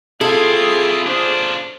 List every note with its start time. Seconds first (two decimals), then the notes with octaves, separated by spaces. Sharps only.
0.21 C4 E4 F4 G#4 A4 C6
1.06 D4 F4 C5